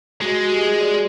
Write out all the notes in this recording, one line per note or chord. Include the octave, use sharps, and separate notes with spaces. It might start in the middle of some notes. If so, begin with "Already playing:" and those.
G#3 F#4
F#4
G4
G#4
D5